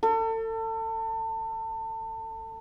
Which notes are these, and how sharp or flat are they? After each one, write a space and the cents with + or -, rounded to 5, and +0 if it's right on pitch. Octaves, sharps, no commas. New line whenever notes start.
A4 +30